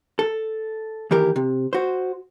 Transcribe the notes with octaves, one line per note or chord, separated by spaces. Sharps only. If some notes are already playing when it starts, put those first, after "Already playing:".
A4
D#2 E3 G4 A#4
C3
F#4 C5